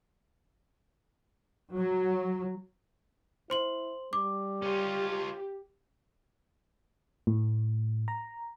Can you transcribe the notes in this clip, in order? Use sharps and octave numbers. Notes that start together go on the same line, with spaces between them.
F#3
E4 C5 C6 F#7
G3 D6
C#4 F4 G4
A2
A#5